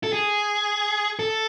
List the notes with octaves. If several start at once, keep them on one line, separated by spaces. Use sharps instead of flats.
A4
G#4
A4